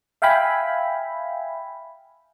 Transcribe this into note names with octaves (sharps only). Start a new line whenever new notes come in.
E5 F5 G5 G#5 B5